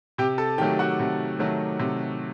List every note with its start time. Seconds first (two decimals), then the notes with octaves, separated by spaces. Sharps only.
0.18 C3 G4 G5
0.38 A4 A5
0.58 D#3 G4 G5
0.62 F#3 A3
0.79 F#4 F#5
1.00 C3
1.39 D#3 F#3 A3
1.79 C3